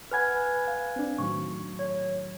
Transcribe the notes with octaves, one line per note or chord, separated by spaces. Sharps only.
B4 F#5 G#5 B5 F6 G#6
F5
C4 D4
A2 D#3 F#3 C#6
C#5